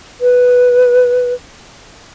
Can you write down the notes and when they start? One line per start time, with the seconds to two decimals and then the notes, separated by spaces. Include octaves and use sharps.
0.21 B4